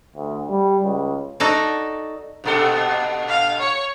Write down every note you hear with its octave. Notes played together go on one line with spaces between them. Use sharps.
D2
G3
C#2
D#4 F#4 A4 D5
G2 A#2 A4
F5
C#5